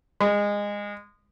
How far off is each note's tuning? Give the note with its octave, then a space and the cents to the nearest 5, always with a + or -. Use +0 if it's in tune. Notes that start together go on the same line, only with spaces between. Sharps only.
G#3 -20